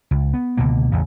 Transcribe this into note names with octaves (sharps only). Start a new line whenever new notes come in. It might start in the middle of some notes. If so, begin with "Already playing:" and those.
C#2
B3
C#2 B2 D3 A#3
A1 E2 C#3